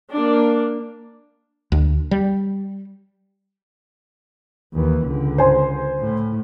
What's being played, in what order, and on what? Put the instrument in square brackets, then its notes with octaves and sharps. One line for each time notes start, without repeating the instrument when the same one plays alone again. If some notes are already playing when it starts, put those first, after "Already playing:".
[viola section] A#3 D4
[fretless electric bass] D2
G3
[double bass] D#2 E3
C#2 D3
[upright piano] C5 G#5 C6
[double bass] A2